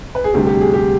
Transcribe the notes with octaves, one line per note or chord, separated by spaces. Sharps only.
B4
G#4
D2 C3 G3 G4
G4
G#4
G4